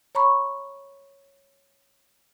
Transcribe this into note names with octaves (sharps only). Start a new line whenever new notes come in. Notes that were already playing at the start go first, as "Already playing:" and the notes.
C#5 A#5 B5 C#6